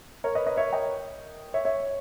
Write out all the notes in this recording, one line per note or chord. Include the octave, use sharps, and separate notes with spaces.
A#4 C#5
B4 D#5
B4 D#5
C#5 E5
D#5 G5
C#5 E5
C#5 E5